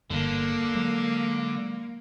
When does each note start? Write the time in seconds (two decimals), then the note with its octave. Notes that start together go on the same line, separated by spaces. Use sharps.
0.10 G1 E2 D3 A#3
0.74 F#3 G#3